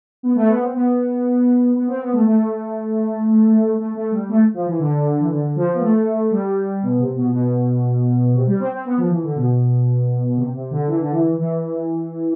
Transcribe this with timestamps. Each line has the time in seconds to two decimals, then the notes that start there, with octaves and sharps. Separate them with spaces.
0.23 B3
0.36 A3
0.48 B3
0.61 C4
0.74 B3
1.75 B3
1.88 C4
2.01 B3
2.13 A3
2.26 A3
3.78 A3
3.95 A3
4.12 G3
4.29 A3
4.54 F3
4.66 E3
4.80 D3
5.20 E3
5.30 D3
5.56 F3
5.74 B3
5.81 A3
6.31 G3
6.83 B2
6.99 C3
7.16 B2
7.33 B2
8.34 C3
8.46 G3
8.60 C4
8.72 C4
8.85 B3
8.98 F3
9.10 E3
9.23 D3
9.36 B2
10.37 C3
10.54 C3
10.71 D3
10.88 E3
11.00 D3
11.11 E3
11.39 E3